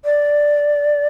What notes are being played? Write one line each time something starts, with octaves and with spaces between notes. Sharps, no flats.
D5